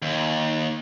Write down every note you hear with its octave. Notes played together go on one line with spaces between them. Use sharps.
D#2